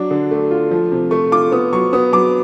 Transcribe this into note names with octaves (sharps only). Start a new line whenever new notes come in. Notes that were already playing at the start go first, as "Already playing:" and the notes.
Already playing: F#3 D4 D6
D3
A3
F4
F3
C3
A3 C#6
F4 D6
B3 D#6
F#3 C#6
B3 D#6
F#3 D6